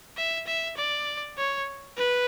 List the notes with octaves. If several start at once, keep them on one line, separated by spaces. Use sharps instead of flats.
E5
E5
D5
C#5
B4